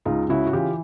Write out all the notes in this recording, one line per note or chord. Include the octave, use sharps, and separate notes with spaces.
C#2 D#4 F4
C#3 E4 F#4
F#4
E3 F4 G4